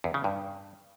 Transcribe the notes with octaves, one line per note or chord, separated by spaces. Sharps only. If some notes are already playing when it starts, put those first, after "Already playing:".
E2
C#3
G2